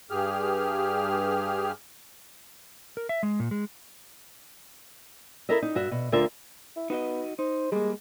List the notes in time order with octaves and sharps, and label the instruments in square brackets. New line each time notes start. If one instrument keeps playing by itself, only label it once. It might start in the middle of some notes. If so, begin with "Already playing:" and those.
[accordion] G2 G4 G#4 F6
[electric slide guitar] A#4
E5
G#3
A#2
G#3
[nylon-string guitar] E4 A4 A#4 D#5 E5
D#4
G2 F#4 E5
B2
D2 D3 F4 A#4 E5
[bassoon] E4
[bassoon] B3 [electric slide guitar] D#4 F#4 D#5
[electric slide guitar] D#4 [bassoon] C5
[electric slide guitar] G3 A#3 [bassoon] G#3